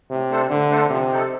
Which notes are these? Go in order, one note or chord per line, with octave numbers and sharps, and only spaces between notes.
A2 C3
A3 D4 A4 C5
A2 D3
A3 D4 A4 C5
C3 F3
C4 D#4 A4